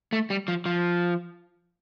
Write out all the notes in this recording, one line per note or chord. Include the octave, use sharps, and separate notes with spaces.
A3
G3
F3
F3